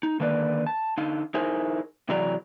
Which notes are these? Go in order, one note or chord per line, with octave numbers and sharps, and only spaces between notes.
D#4
D3 D#3 A#3 B4 D5
A5
D3 D#4 F5
D#4 E4 G#4 A#4 C5 G#5
C3 E3 F#3 G#4 D5 A#5